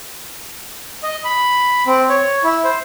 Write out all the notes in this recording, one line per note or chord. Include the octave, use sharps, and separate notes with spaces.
D#5
B5
C4
C#5
E4
C5